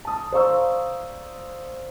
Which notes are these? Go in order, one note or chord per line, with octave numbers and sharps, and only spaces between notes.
A5 D#6
C5 D5 F5 A#5 C#6 E6